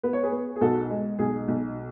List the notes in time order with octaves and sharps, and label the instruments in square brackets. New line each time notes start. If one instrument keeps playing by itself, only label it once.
[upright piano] B3 B4
C#5
G#4 B4
B3
G#4
B1 F#4 A4
G#3
B1 G#4
B1